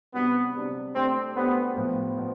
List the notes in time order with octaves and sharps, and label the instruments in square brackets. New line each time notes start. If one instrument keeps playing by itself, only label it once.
[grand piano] C3 G3 D4 [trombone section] B3
[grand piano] C3 G3 D4
[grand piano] A3 D4 G4 C5 [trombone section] C4
[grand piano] A3 D4 G4 C5 [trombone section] B3
[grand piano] A2 F3 B3
F3 B3